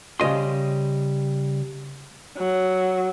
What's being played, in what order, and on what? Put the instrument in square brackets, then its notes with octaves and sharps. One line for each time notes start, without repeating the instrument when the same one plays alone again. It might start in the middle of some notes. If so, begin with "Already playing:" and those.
[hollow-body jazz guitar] C#3 G3 D#5 C6
[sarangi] F#3